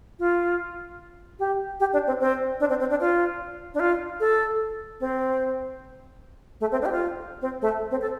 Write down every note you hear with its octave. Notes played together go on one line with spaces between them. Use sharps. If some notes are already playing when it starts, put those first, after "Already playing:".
F4
G4
G4
D4
C4
C4
D4
C4
C4
D4
F4
D4
F4
A4
C4
A3
C4
D4
G4
F4
C4
A3
C4
A4